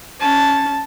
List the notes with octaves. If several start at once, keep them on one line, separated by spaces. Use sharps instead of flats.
C#4 A5